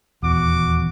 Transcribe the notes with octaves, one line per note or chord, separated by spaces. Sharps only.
D#1 E2 F#4 D6